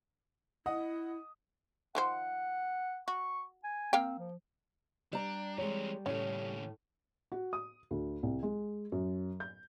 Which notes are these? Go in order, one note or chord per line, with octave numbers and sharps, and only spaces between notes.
E4 D#5 F#5 D#6
D#3 F3 C5 F#5
F#4 C#6
G#5
A#3 C4 F5 G5
F3
G3 D4 A#5
E3 G#3 C4 C#5
D#2 A2 C#3 A3 C#4
F#4
D#6
D2
C2
G#3
F#2
G6